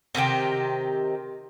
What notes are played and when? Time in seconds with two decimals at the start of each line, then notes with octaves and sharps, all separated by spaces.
0.15 C3 D#3 G4 G5